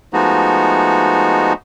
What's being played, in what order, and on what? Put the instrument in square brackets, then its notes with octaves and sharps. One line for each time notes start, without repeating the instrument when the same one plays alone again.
[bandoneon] F3 G#3 A3 B3 D#4 F#4